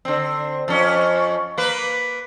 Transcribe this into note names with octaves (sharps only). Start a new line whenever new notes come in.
D3 C4
F2 C#4
A#3 B4